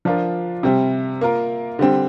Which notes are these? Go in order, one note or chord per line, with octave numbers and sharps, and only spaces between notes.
F3 D4 F4 A#4
C3 G3 C4
A#3 F4 A#4
D3 G3 C4